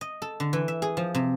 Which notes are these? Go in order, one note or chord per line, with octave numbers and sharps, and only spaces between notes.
D#5
A4
D3
E3
E5
G#4
F3
C3